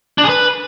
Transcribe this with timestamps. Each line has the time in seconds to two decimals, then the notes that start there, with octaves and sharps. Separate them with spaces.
0.18 D4
0.23 G#4
0.29 B4